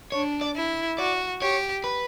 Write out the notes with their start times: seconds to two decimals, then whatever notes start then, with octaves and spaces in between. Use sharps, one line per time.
0.12 D4 C#5
0.41 D5
0.56 E4
0.98 F#4 D5
1.42 G4 C#5
1.84 B4